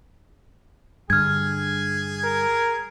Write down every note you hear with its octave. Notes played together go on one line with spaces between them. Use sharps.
G2 D3 G#4 G#5 F6 G#6
A#4